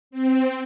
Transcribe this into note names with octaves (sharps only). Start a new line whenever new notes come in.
C4